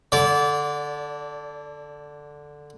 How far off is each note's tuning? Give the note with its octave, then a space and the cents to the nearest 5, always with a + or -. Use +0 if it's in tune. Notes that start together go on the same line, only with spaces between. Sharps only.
D3 +0 D5 -25